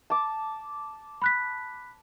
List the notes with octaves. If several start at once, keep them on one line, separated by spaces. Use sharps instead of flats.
A5 D6
B5 F#6 B6